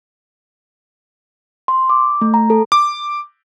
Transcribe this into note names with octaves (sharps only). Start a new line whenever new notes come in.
C6
D6
A3
A#5
A4
D6